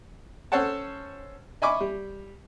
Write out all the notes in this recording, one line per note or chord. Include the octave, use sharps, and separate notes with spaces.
C#4 A4 C5 C#5 F#5 A5
D#5 E5 G#5 B5 C#6 D6
G3